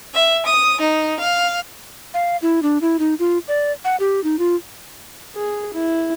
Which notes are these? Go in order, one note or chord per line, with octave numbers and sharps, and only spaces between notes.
E5
D#6
D#4
F5
F5
E4
D4
E4
D#4
F4
D5
F#5
G4
D#4
F4
G#4
E4